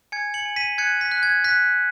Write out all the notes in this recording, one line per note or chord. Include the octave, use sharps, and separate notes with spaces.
G#5 G#6 C#7
C#7 F#7
G#5
B6 D#7
F#6 G#6 C#7
B6
F#6
G#6
F#6 B6